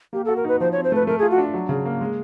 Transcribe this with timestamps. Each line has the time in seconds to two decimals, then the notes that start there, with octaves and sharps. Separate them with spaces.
0.13 A#3 G4
0.25 A4
0.28 F#4
0.36 A#4
0.44 D#4 B4
0.60 F3 C5
0.72 C#5
0.76 C4
0.84 C5
0.92 A3 B4
1.07 A3 A#4
1.19 G#4
1.22 F4
1.31 F#4
1.38 D4
1.54 F#3
1.69 C#3
1.85 A#3
2.01 G#3